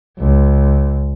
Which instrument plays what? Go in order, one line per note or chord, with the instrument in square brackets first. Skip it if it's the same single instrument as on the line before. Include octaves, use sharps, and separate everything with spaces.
[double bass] C#2